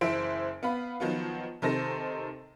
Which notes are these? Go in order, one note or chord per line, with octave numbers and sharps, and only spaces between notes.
F#1 E3 C5 E5 D7
B3 F5 B5
D#3 F3 F#3 B3 F4
C3 D#3 A4 C5 A#6